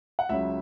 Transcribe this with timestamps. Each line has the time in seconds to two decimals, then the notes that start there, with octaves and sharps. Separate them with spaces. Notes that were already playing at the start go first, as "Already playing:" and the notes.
0.19 F#5
0.29 C#2 C#3 F#3 E5